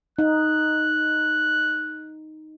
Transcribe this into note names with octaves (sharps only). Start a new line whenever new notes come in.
D#4 F#6